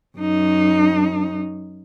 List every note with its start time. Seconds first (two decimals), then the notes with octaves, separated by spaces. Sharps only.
0.18 F#2 D#4